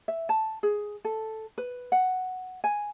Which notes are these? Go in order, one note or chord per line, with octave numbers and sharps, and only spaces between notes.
E5
A5
G#4
A4
B4
F#5
G#5